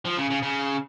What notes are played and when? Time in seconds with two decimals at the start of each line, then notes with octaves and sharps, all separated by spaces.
0.05 F3
0.17 C#3
0.30 C#3
0.42 C#3